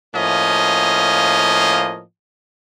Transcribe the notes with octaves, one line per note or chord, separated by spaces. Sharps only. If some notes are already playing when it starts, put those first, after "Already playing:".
A2 F3 A#3 C#4 D#5